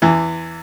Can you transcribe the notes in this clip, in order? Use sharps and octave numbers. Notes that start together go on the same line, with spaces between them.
E2 E3